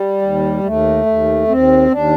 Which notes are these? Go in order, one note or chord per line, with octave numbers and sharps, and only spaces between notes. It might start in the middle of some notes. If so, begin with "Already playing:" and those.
Already playing: G3
D#2
D#2 A3
D#2
D#2 C4
D#2 D4